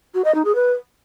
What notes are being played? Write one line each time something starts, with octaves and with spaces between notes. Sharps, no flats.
F#4
D#5
D#4
G#4
B4